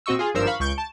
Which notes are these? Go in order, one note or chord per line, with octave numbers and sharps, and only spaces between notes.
A#2 C4 F#4 D#5 C#6 E6
F4 G#4
G#1 G2 F3 A#4 C5 E6
F5 B5 C#6
C#2 C#6 G6 D7
A5